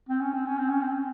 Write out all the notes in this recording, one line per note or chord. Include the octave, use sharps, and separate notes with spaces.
C4
C#4
C4
C#4
C4
C#4
C4